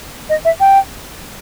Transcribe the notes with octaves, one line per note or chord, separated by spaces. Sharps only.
D#5
E5
G5